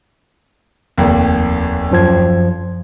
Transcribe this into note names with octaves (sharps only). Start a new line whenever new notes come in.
F1 D#2
F#2 F3 G#6